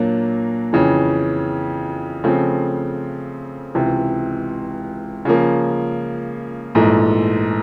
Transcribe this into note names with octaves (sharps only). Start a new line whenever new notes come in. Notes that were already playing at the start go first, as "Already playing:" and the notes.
Already playing: A#2 F#3 A#3 D4
F2 C#3 E3
C#3 F3 A3 C4
C#2 C3 E3
C#3 F3 A#3
A#1 G#2 E3 A3